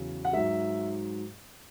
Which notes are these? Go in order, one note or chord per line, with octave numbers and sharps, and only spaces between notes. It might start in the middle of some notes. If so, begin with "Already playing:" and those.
Already playing: E2 C#3 F#3
F#5
G#2 F#3 E5